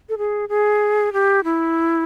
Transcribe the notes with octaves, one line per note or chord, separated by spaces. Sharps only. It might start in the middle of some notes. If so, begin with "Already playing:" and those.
A4
G#4
G#4
G4
E4